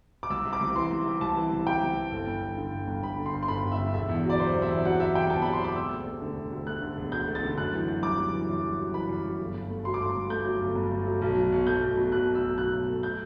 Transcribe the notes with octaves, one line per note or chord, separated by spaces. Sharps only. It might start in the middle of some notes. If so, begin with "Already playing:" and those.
D6
C2 E6
C3
D6
C2
E3 C6
C2
C3
C2 A5
E3
C2
C3 G5
C2
E3
G1
G2
G1
D3
G1
G2
G1 B5
D3
C6
G1
C6
G2 B5
G1
E5
D3
E1 E5
E2
F#3
D5
C3 C5
E1
E5
E2
F#3 F#5
C3 E5
E1 G5
E2 A5
F#3 B5
C6
C3 D6
E1 E6
D2
A3
D3
E1
D2
A3 F#6
D3
E1
D2 G6
A3
A6
D3
F#2 F#6
E3
F#2
G3 D6
F#2
E3
F#2
G3
F#2
E3 B5
F#2
G3
G1
G2
A3
F#3 C6
D6
G1 C6
G2
A3 G6
F#3
G1
G2
A3
F#3
B1
B2
B1
A3 G6
B1
B2
B1 F#6
A3
E6
B1
B2 F#6
B1
A3
G6